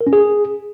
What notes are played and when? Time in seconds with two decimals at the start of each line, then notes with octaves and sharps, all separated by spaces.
0.01 A#4
0.07 C#4
0.13 G#4